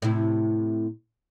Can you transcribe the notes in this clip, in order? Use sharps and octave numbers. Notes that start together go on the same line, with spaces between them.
A2 C3 E4